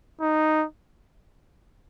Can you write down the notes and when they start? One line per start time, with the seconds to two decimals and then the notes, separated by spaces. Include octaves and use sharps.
0.21 D#4